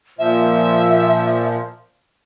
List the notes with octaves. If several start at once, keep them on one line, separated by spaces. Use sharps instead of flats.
A#2 F3 E5